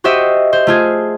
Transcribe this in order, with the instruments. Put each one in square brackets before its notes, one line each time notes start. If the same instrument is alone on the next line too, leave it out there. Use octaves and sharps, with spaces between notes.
[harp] F#4 G4 C5 D#5 E5
C5
A3 F4 G#4